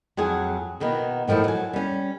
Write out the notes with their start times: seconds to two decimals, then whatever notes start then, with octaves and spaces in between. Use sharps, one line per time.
0.17 F2 F#3 G#4 G#5
0.80 B2 D#3 A#3 B3
1.28 A2 D#3 F3 A3 E4
1.44 F#3 G#5
1.73 G3 C#4